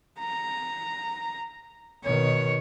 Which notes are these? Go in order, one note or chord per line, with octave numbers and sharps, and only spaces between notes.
A#5
B2 D#3 C#5